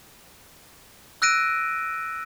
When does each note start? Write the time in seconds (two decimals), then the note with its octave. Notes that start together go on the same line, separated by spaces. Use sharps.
1.22 E6 F#6 A#6 D7 D#7